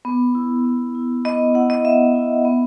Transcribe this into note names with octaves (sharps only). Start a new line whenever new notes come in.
B3
E4
B3
E4
B3 D#5
E4 F#5
D#5
B3 E5
E4
B3